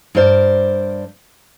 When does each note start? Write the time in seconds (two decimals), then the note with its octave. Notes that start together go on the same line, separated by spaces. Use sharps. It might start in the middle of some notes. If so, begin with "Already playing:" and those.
0.15 G2 A#4 C5 D5